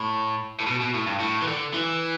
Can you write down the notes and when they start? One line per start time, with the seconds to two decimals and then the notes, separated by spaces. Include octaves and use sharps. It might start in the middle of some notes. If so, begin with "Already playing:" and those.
Already playing: A2
0.60 A2
0.66 B2
0.81 B2
0.94 A2
1.07 G2
1.20 A2
1.42 E3
1.47 D3
1.74 E3